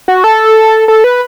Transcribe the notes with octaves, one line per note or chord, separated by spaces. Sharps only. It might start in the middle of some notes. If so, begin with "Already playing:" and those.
F#4
A4
A4
B4